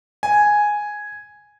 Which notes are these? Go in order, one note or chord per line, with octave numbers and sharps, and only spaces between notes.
G#5